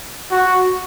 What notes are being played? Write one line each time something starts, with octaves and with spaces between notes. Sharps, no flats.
F#4